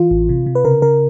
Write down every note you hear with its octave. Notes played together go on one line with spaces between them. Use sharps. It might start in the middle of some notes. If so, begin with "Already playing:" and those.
Already playing: E3 F4
A1
C3
C3
B4
C#3 A#4
C#3 A#4